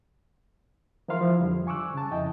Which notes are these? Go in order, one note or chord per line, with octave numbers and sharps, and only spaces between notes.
E3 F3 E4 A#4 F5 C6
F3 E4
F2 D3 G3
G#5 C#6 D6 E6 F#6
C#3 A5
F2 E4 D#5 G5